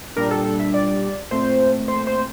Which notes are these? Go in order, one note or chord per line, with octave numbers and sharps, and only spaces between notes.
A#2 G3 D4 A#4
A4
A4
E5
D5
A#2 A3 C4 C5
C5
C5